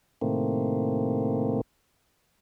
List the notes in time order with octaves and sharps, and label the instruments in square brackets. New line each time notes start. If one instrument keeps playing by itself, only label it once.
[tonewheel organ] A2 C3 D#3 A3 A#3 C4